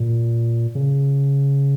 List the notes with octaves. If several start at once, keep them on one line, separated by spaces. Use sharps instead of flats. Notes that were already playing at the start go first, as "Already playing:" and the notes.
Already playing: A#2
C#3